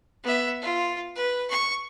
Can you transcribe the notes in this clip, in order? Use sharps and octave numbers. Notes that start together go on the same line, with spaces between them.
B3 E5
F4
B4
C#6